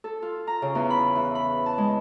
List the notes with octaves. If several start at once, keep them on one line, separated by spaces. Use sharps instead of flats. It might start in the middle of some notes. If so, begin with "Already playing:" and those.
A4
F4
A#5
C#3
E2
B5
E3
B5
A5
G#3